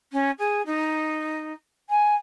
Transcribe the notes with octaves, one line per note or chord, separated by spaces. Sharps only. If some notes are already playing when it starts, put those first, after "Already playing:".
C#4
G#4
D#4
G#5